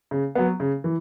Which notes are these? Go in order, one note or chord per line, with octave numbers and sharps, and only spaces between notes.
C#3
F#3 B3
C#3
E3